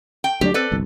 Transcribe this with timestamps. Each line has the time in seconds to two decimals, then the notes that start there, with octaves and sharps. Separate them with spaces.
0.24 G5
0.41 D2 F#3 D4 G4
0.54 C4 A4 B4 D5
0.72 G1 C2